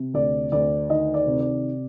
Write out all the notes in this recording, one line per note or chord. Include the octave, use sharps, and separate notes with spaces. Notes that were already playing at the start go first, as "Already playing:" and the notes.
Already playing: C3
D2 D5
D2 D5
D#3 D#5
D5
C3
D5